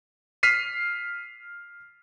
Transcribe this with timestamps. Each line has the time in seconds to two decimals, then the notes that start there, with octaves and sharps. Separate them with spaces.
0.43 F6 B6 C7 D#7